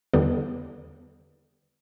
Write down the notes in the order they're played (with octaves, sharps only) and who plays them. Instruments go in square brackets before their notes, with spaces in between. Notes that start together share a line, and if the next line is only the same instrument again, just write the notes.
[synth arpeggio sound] E2 D3 G3 B3